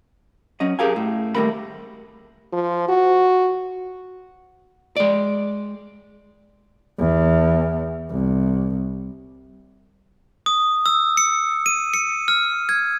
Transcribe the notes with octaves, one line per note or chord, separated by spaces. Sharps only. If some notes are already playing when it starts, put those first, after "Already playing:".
F#3 C#4 D#5
G4 G#4 A#4 F5 G#5
A2
D#2 D#3 G3 A3 A#4 B5
F3
F#4
G#3 D5
E2
C2
D#6
E6
C#7
D#7
C#7
F6
G#6